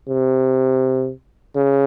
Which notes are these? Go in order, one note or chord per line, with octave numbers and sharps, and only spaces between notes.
C3
C#3